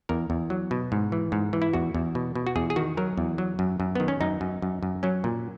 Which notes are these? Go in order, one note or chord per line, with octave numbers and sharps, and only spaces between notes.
E2 A#4
E2
F#3
B2
G#2
E3
G#2
E3
E4
E2 F#4
E2
B2
B2
F#4
E2 G#4
G#4
D#3 F#4
F#3 A#4
E2
F#3
F#2
F#2
D#3 B3
C#4
F#2 D#4
F#2
F#2
F#2
F#3 C#4
A#2